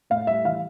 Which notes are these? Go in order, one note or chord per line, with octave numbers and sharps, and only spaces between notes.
A2 F5
G3 E5
E3 F5